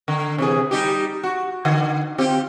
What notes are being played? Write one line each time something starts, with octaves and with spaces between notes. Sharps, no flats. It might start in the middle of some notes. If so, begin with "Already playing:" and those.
D3
C3 E3 G#4
G3 D#4 G4
F#4
D3
C4 F4 G4